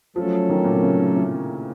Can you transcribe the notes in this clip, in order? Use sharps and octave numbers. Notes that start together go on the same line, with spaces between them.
F3 F#3 A3 C#4 A4
D#3
A#2
C3
C#3
A2